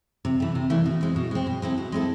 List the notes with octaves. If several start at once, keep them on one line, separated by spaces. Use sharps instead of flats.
C3
E3 A3
C3
E3 A3
B2
G#3 C4
B2
G#3 C4
B2
G#3 C4 E4 A4
B2
G#3 C4 E4 A4